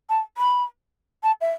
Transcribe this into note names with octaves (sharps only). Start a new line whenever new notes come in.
A5
B5
A5
E5